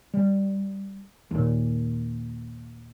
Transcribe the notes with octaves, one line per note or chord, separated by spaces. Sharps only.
G3
D#2 A#2